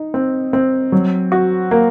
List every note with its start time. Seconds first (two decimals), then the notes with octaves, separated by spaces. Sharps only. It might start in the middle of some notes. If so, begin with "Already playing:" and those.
Already playing: D#4
0.14 C4
0.53 C4
0.92 F#3
1.32 F#4
1.71 A#3